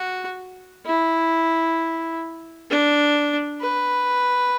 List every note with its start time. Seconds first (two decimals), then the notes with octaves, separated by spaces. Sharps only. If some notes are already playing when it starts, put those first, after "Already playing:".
Already playing: F#4
0.86 E4
2.70 D4
3.61 B4